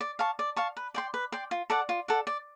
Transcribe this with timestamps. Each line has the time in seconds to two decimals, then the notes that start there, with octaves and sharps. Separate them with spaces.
0.01 D5
0.19 F5 A5 C#6
0.39 D5
0.56 F5 A5 C#6
0.77 B4
0.94 D5 G5 C6
1.14 B4
1.32 D5 G5 C6
1.51 F4
1.70 A4 D5 F#5
1.89 F4
2.08 A4 D5 F#5
2.27 D5